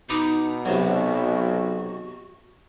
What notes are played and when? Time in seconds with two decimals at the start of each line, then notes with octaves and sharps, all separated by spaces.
0.10 B2 D#4 B5 D6 D#6
0.66 B1 C3 F#3 F#4